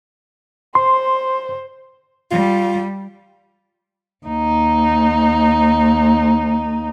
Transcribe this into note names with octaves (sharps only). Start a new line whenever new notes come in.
C5 C6
G3 F4
D#2 D#4